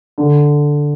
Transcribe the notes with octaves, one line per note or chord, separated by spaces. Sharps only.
D3